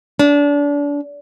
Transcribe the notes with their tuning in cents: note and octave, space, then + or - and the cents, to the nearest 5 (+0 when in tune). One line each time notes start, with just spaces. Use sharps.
D4 -30